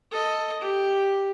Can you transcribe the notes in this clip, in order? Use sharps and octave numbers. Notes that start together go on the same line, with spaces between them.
A4 D#5
G4